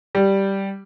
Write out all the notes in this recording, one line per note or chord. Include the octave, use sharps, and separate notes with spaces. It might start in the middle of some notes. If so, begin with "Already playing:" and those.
G3